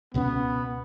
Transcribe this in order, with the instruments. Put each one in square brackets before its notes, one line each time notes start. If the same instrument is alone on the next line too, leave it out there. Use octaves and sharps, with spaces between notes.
[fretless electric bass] C#2 B2 F#3 C#4 [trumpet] B3